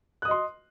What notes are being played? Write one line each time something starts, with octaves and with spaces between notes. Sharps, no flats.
D#5 C6 D#6 F#6